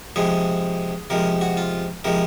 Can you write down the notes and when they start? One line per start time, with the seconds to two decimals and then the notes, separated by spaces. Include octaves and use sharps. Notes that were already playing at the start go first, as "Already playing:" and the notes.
0.16 C3 F3 G#3 G#4
1.10 C3 F3 G#3 A#4
1.41 F#4
1.57 F4
2.04 C3 F3 G#3 A#4